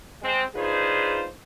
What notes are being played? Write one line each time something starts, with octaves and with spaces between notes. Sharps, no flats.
G#3 C4
D4 D#4 F4 G#4 B4 C5